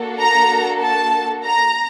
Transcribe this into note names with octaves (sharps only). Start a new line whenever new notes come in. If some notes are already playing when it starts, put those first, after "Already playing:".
Already playing: A#3 D4 F#4 A4
A#5
A5
A#5